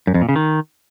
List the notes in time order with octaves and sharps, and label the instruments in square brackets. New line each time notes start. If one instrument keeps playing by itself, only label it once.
[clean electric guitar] F#2
F2
A#2
C#3
D#3